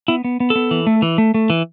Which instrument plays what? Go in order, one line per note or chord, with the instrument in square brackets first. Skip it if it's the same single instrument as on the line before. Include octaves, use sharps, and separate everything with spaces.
[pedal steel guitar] B3 E4
B3
B3
A4
B3
E3
A3
E3
A3
A3
E3